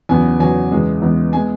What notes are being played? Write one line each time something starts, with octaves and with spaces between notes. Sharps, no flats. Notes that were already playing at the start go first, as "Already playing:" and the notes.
E2 C#3 F#3 B3 G#5
E2 C#3 F#3 B3 G#5
E2 C#3 G#3 B3
E2 C#3 G#3 B3
G#3 B3 G#5